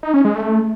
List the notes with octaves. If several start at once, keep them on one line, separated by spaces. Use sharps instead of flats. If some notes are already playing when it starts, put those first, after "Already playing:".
D#4
C#4
G#3
A3